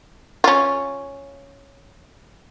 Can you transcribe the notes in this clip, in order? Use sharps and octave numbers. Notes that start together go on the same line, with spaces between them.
C#4 F4